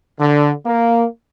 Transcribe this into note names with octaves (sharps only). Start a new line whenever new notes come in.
D3
A#3